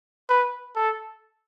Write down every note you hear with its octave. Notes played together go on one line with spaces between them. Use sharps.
B4
A4